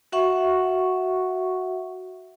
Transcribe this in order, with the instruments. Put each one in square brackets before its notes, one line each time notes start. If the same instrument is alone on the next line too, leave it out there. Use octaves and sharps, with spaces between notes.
[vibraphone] F#4 E5 F#5 C#6